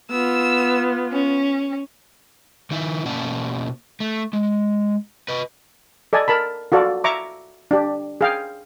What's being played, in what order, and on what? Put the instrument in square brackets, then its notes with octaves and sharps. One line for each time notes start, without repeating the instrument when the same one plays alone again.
[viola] B3 F4 [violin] E6
[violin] C#4
[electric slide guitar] D#3 D#4 E4 E5
B2 A#3 C#4 D5 F#5 A5
A3
G#3
B4 D#5
[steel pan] A4 D5 D#5 G#5
A#4 A5 B5
F4 F#4 A4 D5
E5 A#5 C#6 D6
D4 G4
G#4 F5 G5